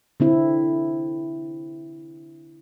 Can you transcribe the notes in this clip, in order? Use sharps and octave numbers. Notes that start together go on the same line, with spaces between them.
D3 C4 E4